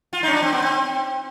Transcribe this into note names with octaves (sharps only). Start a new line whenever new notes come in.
F4
C#4 D#4
D4
C4
B3
C4